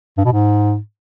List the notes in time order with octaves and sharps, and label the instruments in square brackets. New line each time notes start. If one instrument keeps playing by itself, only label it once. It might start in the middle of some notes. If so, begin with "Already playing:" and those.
[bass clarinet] G2
B2
G#2